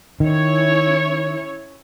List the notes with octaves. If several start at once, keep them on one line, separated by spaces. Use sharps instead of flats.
D#3 C#4 E4 C#5